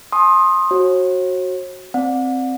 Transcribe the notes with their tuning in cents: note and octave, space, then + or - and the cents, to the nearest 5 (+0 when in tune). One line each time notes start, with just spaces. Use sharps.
G#5 +40 C6 +25 D#6 +0
F#4 +0 C#5 -45
C4 +0 D5 +0 F#5 -35